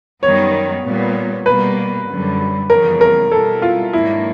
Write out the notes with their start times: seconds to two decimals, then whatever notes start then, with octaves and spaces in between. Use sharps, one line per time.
0.23 F#2 D#3 G3 B3 C#5
0.84 A#2 G3 B3
1.46 B2 G3 A#3 B4
2.08 F#2 D3 G3
2.70 F2 C#3 E3 G3 B3 A#4
3.01 A#4
3.31 B2 G3 B3 E4 A4
3.62 F4
3.93 G#2 D#3 F#3 A#3 D4 E4